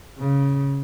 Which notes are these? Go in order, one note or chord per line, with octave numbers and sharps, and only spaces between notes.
C#3